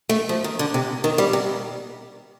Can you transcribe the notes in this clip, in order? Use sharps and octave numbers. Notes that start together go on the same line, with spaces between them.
A3
F3
D#3
D3
C3
D#3
G3
C3